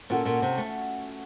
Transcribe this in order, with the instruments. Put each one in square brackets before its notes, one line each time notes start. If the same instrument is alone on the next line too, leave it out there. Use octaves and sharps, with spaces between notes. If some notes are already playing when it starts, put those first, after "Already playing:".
[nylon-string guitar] A#2 [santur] C#4 F#4 A4
[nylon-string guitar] A#2
C3
A3